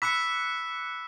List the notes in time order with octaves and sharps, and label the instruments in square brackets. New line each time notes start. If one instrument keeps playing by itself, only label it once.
[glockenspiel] B5 E6 B6 [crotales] D6 F#6 C#7